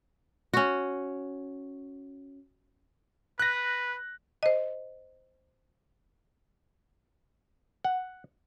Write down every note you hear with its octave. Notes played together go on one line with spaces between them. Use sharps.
C#4 F#4
B4 F#6 A#6
C5 D#5
F#5